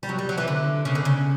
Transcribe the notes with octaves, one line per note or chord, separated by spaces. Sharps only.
G3
F#3
G3
F#3
E3
D3
C#3
D3
C#3